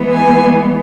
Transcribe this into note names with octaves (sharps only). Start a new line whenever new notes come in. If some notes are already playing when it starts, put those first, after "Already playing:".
Already playing: E3 G#3 B3
G#5